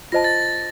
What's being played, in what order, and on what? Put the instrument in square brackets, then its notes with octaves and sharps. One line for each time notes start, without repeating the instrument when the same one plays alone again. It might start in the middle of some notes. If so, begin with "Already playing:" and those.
[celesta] F4 C5 D#5 A5 [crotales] A#6
[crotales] A6